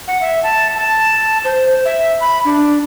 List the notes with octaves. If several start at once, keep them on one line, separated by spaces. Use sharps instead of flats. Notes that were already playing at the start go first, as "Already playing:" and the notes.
F#5
E5
A5
A5
C5
E5
B5
D4